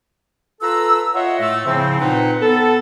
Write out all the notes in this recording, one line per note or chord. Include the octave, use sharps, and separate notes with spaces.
F4 A4 B4 A#5 E6
F4 C#5 D#5 E5 F#5
A2 A3 E6
A2 C#3 F3 C4
A#2 C4 D#4 B4 C5 F#5
B3 A4